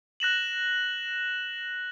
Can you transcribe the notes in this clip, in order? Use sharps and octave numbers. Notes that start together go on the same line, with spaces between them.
F#6 A#6 E7 F#7